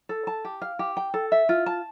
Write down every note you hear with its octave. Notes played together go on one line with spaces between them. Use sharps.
A4
A5
G4
F5
G4
G5
A4
E5
F4
A5